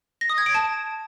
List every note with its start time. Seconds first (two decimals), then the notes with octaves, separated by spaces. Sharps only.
0.21 A#6
0.30 D#6
0.38 G#6
0.46 D7
0.55 A5